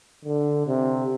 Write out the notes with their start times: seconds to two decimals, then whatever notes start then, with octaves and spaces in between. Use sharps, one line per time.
0.25 D3
0.67 C3